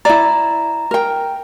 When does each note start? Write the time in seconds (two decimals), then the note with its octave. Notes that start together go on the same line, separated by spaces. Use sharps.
0.05 E4 D5 A#5
0.91 A#4 G5